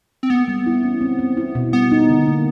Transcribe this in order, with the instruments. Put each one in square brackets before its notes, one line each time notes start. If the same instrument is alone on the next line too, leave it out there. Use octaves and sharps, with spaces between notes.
[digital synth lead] C4
[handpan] A#3 [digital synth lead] B3
[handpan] G3
E4
C#4
C4
C4
E4
B2
[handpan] G3 [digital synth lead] B3
[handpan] D#4
D3
A#3